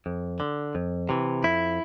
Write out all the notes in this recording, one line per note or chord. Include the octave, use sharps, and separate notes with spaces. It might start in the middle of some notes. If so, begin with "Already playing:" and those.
F2
D3
F2
C3 E3
F2 E4